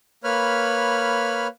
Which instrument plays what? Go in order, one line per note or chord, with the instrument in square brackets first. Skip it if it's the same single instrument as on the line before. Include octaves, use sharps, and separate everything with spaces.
[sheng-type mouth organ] A#3 B4 C#5 B5 F6